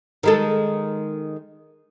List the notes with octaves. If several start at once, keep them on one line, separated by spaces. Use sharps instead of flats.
D#3 G#3 A4